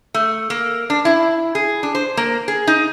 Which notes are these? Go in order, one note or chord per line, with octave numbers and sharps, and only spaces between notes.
A3
A#3
D4
E4
G#4
D4
C5
A#3
G#4
D#4